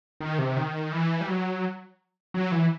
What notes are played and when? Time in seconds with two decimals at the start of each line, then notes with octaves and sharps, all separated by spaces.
0.20 D#3
0.39 C3
0.56 D#3
0.92 E3
1.21 G3
1.28 F#3
2.34 F#3
2.52 E3